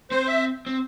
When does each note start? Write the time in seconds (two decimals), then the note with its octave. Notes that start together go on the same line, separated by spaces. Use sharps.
0.11 C4 C5
0.28 E5
0.66 C4